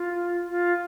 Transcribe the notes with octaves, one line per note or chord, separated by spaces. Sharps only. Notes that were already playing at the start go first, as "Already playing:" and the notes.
Already playing: F4
F4